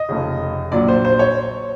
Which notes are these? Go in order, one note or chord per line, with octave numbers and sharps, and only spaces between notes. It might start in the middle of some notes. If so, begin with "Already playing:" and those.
Already playing: D#5
F1 F2 C#3
A#1 A#2 F#3 D5
C5
C5
C#5